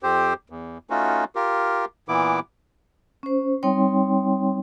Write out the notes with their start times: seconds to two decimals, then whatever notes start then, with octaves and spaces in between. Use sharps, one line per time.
0.03 F2 C4 G4 C5
0.50 E2
0.90 A3 C#4 D#4 F4 F#4
1.35 F4 G4 A#4
2.09 A#2 E3 B3 E4 D6
3.23 C#4 C5
3.63 G3 C4 D#4 C#5 G5 C6